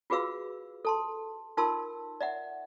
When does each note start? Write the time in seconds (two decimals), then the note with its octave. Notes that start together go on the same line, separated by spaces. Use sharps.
0.10 F4 F#4 G#4 B4 F5 E6
0.85 A4 A5 C6
1.57 D#4 F4 A#4 A5 C6 E6
2.21 D5 E5 F#5